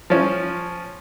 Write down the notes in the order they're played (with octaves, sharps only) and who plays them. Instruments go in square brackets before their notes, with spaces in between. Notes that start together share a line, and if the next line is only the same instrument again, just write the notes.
[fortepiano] F3 C#4